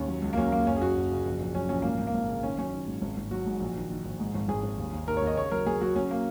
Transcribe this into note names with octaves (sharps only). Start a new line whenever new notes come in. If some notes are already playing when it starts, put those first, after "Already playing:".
Already playing: D#2 C#4
F#3
C#2
A#3
F#3 C#4
F#3 A#3
F#1 C#4
G#4
F#1 F#4
F#1
C#3
A#1
A#1
F#3 C#4
A#1 C#4
G#1 A#3
G#1
A#3
G#1
C#3
D#3 C#4
F#3 C#4
D#3
G#2
G#1
G#1
F#3 F#4
G#2
A#1
D#3
D#3
A#1
G#2
G#1
G#1 G#4
G#1
D#2
D#2
D#2 A#4
C#5
D#2
D#5
C#3 C#5
F#3 A#4
F#3 G#4
F#3 F#4
F#3 C#4
A#3